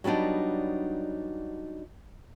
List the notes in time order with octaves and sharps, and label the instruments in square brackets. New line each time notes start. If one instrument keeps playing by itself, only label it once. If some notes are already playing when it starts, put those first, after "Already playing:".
[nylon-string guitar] F#3 G3 B3 D4 D#4